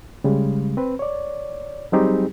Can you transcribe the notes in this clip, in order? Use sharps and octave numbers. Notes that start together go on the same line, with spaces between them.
C#3 G3 G#3
C4 B4
C#5 D5
F#3 G3 C4 D#4 G4 G#4